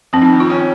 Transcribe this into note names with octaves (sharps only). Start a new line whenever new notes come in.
F2 C4
D#4
D#3
F4
C#4